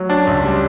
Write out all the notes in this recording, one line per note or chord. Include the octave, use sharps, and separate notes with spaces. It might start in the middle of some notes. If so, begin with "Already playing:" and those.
Already playing: F#3
C#4 D4
C#2
G3